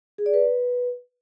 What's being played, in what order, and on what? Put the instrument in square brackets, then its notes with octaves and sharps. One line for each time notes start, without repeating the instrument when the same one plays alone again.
[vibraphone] G#4
D5
B4